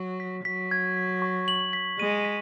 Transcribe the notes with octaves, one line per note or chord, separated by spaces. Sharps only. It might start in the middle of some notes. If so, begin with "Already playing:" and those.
Already playing: F#3
B6
F#3 B6
G#6
B6
C#6
F#7
B6
G#3 D#7
B6